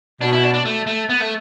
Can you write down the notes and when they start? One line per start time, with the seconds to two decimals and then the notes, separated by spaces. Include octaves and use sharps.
0.21 B2 D4
0.33 E4
0.44 D4
0.54 D4
0.65 A3
0.87 A3
1.09 B3
1.21 A3